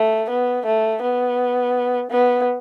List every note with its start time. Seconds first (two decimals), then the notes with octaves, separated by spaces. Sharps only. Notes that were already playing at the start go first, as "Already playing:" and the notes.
Already playing: A3
0.30 B3
0.66 A3
1.02 B3
2.11 B3